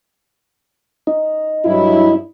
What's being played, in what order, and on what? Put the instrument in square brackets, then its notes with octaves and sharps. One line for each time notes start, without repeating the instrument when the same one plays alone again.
[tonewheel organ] D#4
[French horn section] G2 F#3 E4